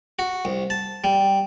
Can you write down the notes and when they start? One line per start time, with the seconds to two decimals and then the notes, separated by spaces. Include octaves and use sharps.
0.19 F#4
0.45 C2
0.70 A5
1.04 G3